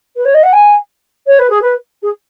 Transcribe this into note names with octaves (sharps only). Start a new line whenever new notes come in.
B4
C#5
D#5
F#5
G#5
C#5
B4
G#4
B4
G#4